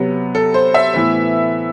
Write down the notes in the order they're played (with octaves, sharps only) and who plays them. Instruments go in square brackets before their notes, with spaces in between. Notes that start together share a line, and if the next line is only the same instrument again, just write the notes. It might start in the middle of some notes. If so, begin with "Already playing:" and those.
Already playing: [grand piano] C3 F#3 B3
A4
C5
E5
A2 E3 B3